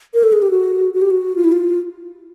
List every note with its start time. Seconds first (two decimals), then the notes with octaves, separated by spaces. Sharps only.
0.14 A#4
0.23 A4
0.32 G#4
0.42 G4
0.50 F#4
0.94 F#4
1.02 G4
1.10 F#4
1.36 F4
1.44 E4
1.52 F4